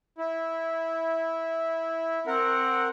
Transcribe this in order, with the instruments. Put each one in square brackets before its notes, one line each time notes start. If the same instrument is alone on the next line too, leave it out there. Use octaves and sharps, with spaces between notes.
[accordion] E4
[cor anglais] C4 [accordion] A#4 F#5